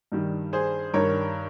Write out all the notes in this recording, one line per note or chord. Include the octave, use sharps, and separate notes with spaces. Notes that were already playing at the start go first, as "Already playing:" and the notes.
G2 D#3 G3
G#4 C5
G2 D#3 G3 A#4 C#5